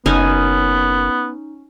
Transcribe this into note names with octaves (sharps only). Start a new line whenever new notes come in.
F#1 B3 C#4 D#4 G#5